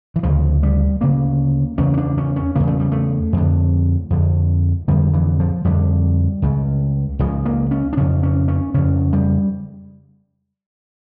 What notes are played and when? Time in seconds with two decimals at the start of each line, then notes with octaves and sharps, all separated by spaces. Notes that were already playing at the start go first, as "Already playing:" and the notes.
0.16 E3
0.23 D2 C#3 F3
0.63 G3
1.01 D2 C#3 A#3
1.78 E2 C#3 C#4
1.94 C#4
1.97 D4
2.18 C#4
2.36 C#4
2.55 E2 C#3 A#3
2.67 A3
2.80 G3
2.92 A3
3.33 F2 D3
4.10 F2 D3
4.88 F2 D3 G3
5.14 E3
5.40 F3
5.64 F2 D3 G3
6.42 C#2 C#3
7.19 C#2 C#3 F3
7.45 A#3
7.71 C#4
7.93 D4
7.97 F2 C#3 C#4
8.23 C#4
8.48 C#4
8.74 F2 C#3 C#4
9.13 G3